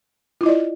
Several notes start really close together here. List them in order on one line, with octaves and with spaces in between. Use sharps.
F4 E4 D#5 D5